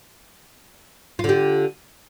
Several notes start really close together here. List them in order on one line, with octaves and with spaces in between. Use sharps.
F4 D3 G4